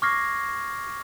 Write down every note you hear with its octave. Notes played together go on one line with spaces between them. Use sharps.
C#6 D6 F6 G#6 A#6 C7